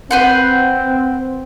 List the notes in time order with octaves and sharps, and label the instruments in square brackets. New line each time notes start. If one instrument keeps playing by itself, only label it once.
[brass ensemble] C4 [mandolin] B4 C5 F#5